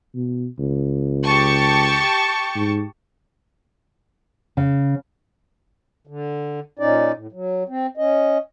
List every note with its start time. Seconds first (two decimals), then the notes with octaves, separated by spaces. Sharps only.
0.14 B2
0.59 C#2
1.23 G4 A5 C#6
2.55 G#2
4.57 C#3
6.07 D3
6.79 A#2 C#4 D#4 D5
7.14 A2
7.32 F#3
7.69 C4
7.97 C#4 D#5